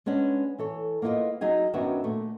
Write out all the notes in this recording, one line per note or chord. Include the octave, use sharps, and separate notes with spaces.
G#3 B3 C#4 D4
E3 A4 C#5
A#3 B3 E4 F4 D#5
F#3 D#4 G#4 G#5
F#2 D#3 F#3 B3 D4 E5
A#2 A3